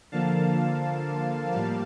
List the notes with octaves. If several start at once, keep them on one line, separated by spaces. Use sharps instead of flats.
D3 F3 A#3 F5 A5
A2 G3 A#3 F5 A5